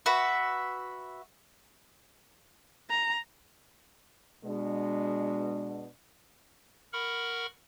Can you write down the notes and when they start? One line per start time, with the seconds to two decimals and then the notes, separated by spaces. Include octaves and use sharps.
0.06 F#4 B4 E5
2.90 A#5
4.45 B2 G#3 D4
6.93 A#4 F#5 B5 C#6 F6